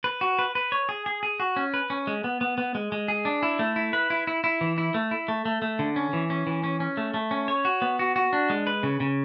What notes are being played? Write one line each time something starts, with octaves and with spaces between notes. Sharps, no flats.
B4
F#4
B4
B4
C#5
G#4
G#4
G#4
F#4
C#4
B4
C#4
G#3
B3
B3
B3
G#3
G#3
G#4
D4
E4
A3
E4
B4
E4
E4
E4
E3
E4
A3
E4
A3
A3
A3
D3
C#4
E3
C#4
E3
C#4
C#4
A3
A3
C#4
C#5
F#4
B3
F#4
F#4
D4
G#3
B4
C#3
C#3